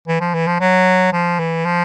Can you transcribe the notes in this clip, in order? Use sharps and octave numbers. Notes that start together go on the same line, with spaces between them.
E3
F3
E3
F3
F#3
F3
E3
F3